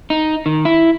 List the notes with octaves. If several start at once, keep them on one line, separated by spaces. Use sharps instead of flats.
D#4
D#3
E4